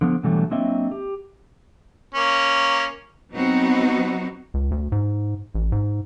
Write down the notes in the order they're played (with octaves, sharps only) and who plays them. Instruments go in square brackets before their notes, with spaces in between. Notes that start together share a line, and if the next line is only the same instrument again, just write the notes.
[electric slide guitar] D3 F3 B3
B2 D3 E3 F#3 G3 A3
F#3 A#3 C4 D4 D#5 E5
G4
[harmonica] A#3 C#4
[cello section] F#3 B3 C4 D#4 F#4
[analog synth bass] C#2
D2
G#2
A1
G#2